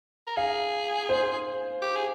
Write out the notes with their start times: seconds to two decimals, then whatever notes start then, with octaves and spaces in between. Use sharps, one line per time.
0.27 A#4
0.37 G#4 F5
1.09 C5
1.82 G4
1.96 G#4